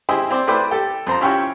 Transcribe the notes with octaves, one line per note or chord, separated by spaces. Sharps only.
E4 G4 G#4 C5 D#5
C4 C5 D5
A3 E4 B4 C5 D5 G5
G4 A4
F2 C5 A#5
C#4 E4 F4 G4 C#5 G5